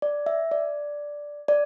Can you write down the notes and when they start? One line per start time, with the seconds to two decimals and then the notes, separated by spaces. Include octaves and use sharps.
0.02 D5
0.26 E5
0.51 D5
1.48 D5